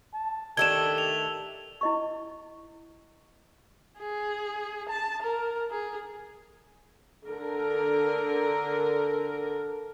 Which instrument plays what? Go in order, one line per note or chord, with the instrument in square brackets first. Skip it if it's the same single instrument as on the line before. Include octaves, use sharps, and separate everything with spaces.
[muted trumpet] A5
[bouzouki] D#3 A3 D4 [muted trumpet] G4 [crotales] E6 G7 [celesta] G#6 E7
[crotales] F7
[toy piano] E4 D#5 C#6
[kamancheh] G#4
A5
A#4
G#4
[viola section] D3 A#4